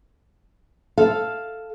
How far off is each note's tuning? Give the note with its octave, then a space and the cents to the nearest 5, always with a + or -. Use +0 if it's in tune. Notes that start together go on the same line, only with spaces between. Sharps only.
A4 +0 F5 +0